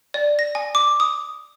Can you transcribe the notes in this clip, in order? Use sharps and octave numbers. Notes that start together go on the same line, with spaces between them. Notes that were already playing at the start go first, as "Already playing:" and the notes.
D5
A#6
G#5
D6
D#6